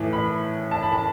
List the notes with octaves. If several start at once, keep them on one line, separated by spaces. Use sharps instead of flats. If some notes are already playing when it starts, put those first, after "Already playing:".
Already playing: A2 E3
B5
A5
B5
A5